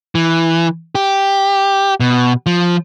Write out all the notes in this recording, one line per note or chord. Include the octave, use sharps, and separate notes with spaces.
E3
G4
B2
F3